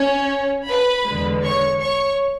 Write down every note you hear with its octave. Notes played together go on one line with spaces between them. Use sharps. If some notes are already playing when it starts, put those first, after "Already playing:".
Already playing: C#4 C#5
B4 B5
E2 D3 G#3
C#5 C#6
C#5 C#6